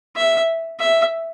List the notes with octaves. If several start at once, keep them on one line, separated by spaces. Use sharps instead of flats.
E5
E5